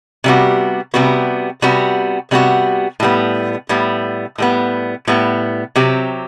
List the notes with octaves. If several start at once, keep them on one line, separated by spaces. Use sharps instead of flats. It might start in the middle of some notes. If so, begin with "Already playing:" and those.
C3 G3 B3 F#4
C3 G3 B3 F#4
C3 G3 B3 F#4
C3 G3 B3 F#4
A2 G3 B3
A2 G3 B3
A2 G3 B3
A2 G3 B3
C3 F#3 C4 G4